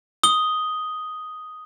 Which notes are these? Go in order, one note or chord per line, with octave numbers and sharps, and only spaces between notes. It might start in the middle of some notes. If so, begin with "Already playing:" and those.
D#6 G7